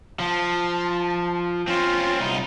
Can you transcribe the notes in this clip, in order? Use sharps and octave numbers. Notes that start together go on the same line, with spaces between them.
F3 A5
C4 C#4 F4
C2 D#4 B5